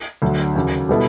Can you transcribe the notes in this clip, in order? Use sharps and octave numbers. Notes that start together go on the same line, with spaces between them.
D2 D3 F#3
D#2 C#3 F#3
B2 G3 B3 E4 A4